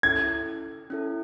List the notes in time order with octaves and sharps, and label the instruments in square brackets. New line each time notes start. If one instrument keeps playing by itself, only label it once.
[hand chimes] C#4 E4 A4 [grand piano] G#6
[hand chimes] C#4 E4 A4